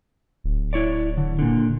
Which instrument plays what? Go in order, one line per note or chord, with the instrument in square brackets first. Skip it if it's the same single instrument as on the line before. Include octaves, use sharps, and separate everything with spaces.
[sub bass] D1
[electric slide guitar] E4 C#5 D5
D3
A#2 D3